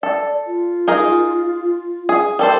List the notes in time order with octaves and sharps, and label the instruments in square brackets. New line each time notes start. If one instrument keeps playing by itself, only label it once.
[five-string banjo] A4 [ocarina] D5
[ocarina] F4
[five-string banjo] D#4 G#4 A#4
G#4
[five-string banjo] G3 A4 C5 [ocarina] A#4